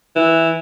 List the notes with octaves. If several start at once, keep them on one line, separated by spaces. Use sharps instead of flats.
E3